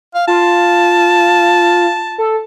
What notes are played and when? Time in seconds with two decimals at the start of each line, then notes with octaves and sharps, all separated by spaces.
0.14 F5
0.27 F4 A5
2.18 A4